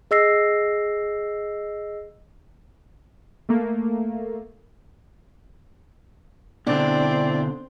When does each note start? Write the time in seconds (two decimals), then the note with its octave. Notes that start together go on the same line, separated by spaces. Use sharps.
0.11 G#4 D#5 E6 A#6 C7
3.49 A3 A#3
6.67 B2 D3 C4 D4 E4 D5